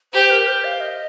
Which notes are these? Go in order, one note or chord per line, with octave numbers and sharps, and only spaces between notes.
G4 C5
A#4
C5
F5
D#5